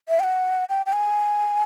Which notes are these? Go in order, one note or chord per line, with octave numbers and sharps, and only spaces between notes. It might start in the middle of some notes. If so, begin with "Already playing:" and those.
E5
G5
F#5
G5
G5
G#5